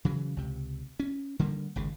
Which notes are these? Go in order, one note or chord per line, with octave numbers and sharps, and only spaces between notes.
C#3 E3 F#3
C#2 C3
C#4
D3 G3 A#3
G#1 C#2 C#3